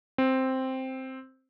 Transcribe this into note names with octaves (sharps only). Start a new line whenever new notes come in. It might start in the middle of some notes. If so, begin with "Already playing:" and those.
C4